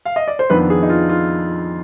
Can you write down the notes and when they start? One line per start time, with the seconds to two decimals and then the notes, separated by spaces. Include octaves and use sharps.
0.05 F5
0.16 D#5
0.28 D5
0.39 C5
0.50 F2 D#3 B3 D4 B4
0.70 G#4
0.83 D#4
0.89 F4
1.09 F4